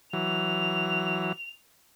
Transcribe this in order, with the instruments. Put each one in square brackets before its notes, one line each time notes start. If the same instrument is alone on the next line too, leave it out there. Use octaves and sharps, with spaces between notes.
[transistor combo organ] E3 F#3 [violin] F7